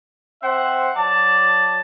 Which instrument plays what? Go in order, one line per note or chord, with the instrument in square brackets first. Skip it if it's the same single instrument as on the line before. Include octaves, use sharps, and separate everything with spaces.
[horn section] C4 C5 E5 F#5
F#3 D5 A5